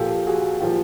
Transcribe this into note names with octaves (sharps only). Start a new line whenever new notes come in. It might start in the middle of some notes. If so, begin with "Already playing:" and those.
Already playing: A#2 F3 G4 A4
F#4 G#4
A#2 F3 F4 G4